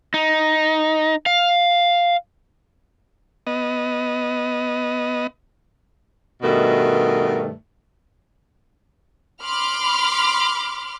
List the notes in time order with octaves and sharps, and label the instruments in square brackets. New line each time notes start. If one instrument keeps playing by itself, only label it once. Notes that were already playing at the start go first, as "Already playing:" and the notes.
[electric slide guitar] D#4
F5
[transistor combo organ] B3 D#5
[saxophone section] G2 B2 D#3 A3
[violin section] B5 C6 D6 F6